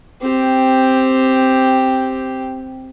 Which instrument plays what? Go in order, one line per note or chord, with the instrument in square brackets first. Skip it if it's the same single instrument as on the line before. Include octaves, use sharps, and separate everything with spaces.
[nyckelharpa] C4 G4